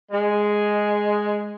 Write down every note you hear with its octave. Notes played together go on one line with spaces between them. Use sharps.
G#3